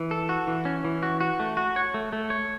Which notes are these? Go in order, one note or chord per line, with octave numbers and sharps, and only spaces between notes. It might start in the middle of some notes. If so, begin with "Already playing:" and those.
Already playing: E3
A4
F#4
E3
C#4
E3
F#4
F#4
A3
F#4
C#5
A3
A3
C#5